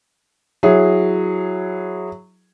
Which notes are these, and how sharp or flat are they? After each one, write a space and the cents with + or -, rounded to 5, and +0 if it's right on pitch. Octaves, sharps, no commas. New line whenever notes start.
F#3 -5 E4 +0 G#4 +0